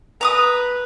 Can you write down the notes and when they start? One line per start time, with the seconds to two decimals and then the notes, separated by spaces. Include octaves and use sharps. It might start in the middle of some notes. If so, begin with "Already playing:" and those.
0.21 B4 A#5 D6 D#6